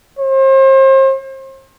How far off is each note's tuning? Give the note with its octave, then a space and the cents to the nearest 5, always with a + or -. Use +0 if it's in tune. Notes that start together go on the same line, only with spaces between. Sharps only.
C5 +35